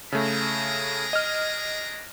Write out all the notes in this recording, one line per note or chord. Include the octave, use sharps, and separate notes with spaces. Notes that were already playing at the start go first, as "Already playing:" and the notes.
C#3 A3 D4 G#4 A#5
D#5 F6